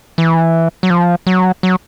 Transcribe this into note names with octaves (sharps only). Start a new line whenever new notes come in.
E3
F#3
F3
F#3
F#3